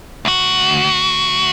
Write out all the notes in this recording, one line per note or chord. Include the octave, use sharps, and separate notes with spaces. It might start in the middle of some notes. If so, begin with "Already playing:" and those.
D2 F#4